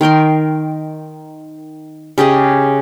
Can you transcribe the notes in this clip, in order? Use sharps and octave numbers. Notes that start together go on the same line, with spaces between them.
D#3 A#4 G5 C6
C#3 G4 G#4 D#5